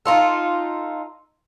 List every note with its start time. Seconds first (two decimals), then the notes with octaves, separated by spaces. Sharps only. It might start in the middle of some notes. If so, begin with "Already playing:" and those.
0.06 D#4 F4 A4